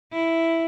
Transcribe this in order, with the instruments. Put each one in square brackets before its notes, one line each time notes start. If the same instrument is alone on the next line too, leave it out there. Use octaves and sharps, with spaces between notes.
[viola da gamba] E4